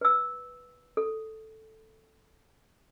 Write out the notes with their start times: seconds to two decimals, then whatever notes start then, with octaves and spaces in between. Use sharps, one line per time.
0.01 B4 E6
0.97 A4